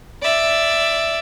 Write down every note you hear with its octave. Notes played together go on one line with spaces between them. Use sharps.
D5 E5